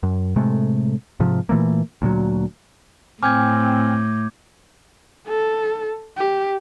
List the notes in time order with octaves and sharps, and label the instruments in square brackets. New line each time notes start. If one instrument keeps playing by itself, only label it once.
[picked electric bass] F#2
A2 C3 G#3 A3
G#2 C3 F3
A#2 E3 A3 A#3
D2 A#2 F#3
[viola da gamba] A2 [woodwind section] C4 [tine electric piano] G5 G#5 F6 [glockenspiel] D6 G6 G#6
[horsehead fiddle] A4
G4